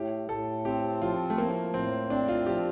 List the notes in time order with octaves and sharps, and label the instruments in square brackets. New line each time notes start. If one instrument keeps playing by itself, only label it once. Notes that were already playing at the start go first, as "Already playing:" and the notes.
Already playing: [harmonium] A2 [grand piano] G4
[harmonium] A2 [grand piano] A4
[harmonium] C4 [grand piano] G4
[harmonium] F3 [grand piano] F4
[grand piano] A3
[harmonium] A2 [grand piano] A#3
[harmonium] A2 [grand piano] C4
[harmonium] C4 [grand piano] D4
[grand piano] F4
[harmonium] F3 [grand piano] G4